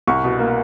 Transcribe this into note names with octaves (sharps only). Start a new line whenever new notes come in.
C2 C#6
B2
A#3